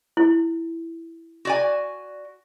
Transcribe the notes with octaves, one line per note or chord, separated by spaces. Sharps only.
E4
F#4 D5 G#5